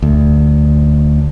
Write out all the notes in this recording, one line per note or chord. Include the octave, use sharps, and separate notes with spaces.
D2